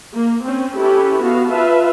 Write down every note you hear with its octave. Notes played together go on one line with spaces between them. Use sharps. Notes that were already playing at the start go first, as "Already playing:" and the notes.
A#3
C4 C#4
C#4 E4 G4 A4 B4
B3 F#4 F5
F4 B4 E5 F5 A5